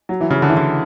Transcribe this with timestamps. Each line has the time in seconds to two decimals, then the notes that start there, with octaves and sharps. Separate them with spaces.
0.09 F#3
0.21 E3
0.30 C#3
0.42 D3
0.49 E3
0.57 D3